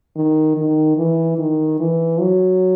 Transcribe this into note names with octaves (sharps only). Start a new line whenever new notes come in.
D#3
D#3
E3
D#3
E3
F#3